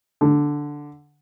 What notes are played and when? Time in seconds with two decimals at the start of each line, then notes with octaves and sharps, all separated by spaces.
0.21 D3